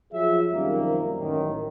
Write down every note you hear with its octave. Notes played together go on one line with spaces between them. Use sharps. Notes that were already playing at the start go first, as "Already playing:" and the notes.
F3 F#3 F4 G#4 E5
F#2 C3 D#3 F3 G3 A#3
A1 F#2 A2 D#3